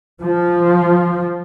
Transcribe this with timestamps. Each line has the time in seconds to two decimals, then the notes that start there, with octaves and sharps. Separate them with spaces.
0.21 F3